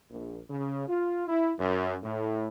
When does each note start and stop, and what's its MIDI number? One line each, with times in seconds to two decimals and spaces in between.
0.11 0.39 34
0.49 0.88 49
0.88 1.27 65
1.27 1.51 64
1.59 1.96 42
2.03 2.48 45